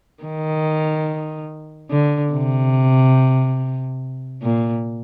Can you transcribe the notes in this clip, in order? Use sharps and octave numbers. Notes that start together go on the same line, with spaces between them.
D#3
D3
C3
A#2